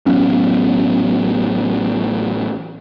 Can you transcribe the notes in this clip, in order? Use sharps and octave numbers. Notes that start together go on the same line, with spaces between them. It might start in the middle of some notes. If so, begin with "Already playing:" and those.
A1 F#3 B3 C#4